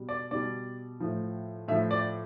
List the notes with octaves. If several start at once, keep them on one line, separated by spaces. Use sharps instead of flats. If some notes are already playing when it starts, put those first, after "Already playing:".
Already playing: B2 G3
D5
B2 G3 D5
A2 F3
A2 F3 E5
D5